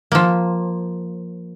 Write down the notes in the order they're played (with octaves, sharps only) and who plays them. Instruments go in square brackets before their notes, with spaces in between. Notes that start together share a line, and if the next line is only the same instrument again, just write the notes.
[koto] F3 A#3